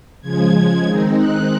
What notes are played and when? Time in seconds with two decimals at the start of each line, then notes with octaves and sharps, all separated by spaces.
0.21 C#3 F3 G#3 G#6
0.85 D#3 G#3 C4 D#4
1.17 F#6